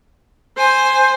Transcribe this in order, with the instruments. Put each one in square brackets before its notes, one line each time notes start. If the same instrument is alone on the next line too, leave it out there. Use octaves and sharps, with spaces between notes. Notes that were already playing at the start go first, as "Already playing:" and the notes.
[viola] C5 [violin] G#5